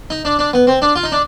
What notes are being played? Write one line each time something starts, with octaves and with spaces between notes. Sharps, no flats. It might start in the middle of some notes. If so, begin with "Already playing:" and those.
D#4
D4
D4
B3
C4
D4
F4
D#4
D4